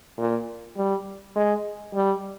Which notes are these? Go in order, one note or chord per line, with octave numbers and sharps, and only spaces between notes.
A#2
G3
G#3
G3